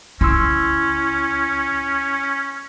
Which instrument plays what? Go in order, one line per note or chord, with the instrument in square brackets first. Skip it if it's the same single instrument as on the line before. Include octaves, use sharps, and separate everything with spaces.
[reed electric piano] C#2 C6 E6 [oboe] C#4 [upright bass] E4